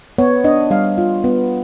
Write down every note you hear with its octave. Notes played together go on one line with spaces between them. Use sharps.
B3 C#5
D4 D#5
G3 F5
F4
B3